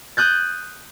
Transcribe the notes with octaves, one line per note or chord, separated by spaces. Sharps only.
D#6 F#6 G6 A6